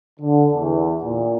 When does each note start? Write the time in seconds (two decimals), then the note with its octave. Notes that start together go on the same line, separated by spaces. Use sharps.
0.20 D3
0.52 E2
1.04 A#2